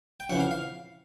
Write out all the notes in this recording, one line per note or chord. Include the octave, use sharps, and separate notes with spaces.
G5
F2 C#3 E3 F#5
F5
F5